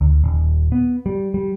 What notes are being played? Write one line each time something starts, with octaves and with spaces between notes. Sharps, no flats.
D2
D#1
B3
G3
G3